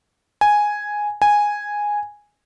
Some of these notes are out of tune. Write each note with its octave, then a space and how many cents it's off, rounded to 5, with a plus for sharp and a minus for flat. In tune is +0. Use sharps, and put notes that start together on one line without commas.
G#5 +0
G#5 -5